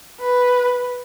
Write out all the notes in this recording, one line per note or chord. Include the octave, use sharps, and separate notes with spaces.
B4